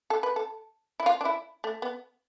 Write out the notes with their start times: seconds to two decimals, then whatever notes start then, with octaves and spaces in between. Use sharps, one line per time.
0.10 A4
0.23 B4
0.36 A4
1.00 E4
1.06 F4
1.21 D4
1.25 E4
1.64 A3
1.82 B3